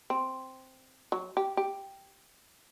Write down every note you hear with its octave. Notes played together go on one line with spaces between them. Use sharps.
C4
F#3
G4
G4